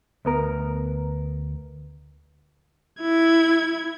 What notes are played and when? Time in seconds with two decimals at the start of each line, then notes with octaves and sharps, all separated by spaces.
0.25 D2 B3 A#4
3.01 E4 G#6